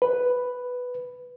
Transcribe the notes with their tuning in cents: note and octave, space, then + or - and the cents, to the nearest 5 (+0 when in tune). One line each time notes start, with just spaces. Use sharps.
B4 +5